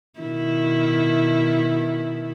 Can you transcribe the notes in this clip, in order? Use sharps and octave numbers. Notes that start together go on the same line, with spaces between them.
B2 D#3 E4